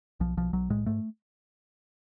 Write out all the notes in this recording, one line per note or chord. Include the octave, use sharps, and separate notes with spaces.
B1 F3
B1 F3
B1 F#3
A2 G#3
G#2 A3